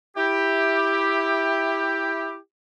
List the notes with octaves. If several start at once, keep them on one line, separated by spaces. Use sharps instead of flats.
E4 G4